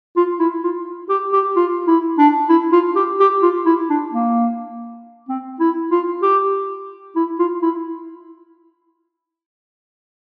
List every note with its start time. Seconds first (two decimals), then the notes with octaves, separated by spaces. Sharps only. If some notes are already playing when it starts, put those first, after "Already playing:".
0.16 F4
0.39 E4
0.63 F4
1.09 G4
1.33 G4
1.56 F4
1.87 E4
2.18 D4
2.49 E4
2.72 F4
2.96 G4
3.20 G4
3.42 F4
3.66 E4
3.89 D4
4.13 A#3
5.28 C4
5.60 E4
5.91 F4
6.22 G4
7.16 E4
7.39 F4
7.62 E4